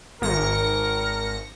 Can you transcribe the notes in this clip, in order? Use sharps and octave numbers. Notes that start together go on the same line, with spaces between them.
G#1 A#4 A#6 C#7